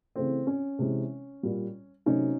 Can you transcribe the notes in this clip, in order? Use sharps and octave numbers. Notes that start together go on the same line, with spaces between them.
C#3 E3 A3 C4
C#4
C3 E3 G#3
A#2 G3
C3 D#3 F#3 A3 C#4 D#4